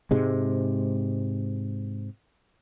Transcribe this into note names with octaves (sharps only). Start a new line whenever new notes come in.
G#2 C3 G#3